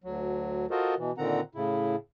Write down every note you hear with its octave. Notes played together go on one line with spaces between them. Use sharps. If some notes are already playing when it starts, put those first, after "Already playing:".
D2 F#3
F4 F#4 A4 A#4 C5 D#5
B2 E3
A#2 D3 D#3 C4 F#5 A#5
A2 C#3 E4